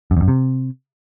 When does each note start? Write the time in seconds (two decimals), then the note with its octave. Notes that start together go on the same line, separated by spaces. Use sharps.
0.11 F#2
0.17 E2
0.22 F#2
0.28 C3